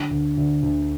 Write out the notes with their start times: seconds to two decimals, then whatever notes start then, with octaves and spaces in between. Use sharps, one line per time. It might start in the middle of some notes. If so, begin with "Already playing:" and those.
Already playing: D3
0.11 D2
0.37 D2
0.63 D2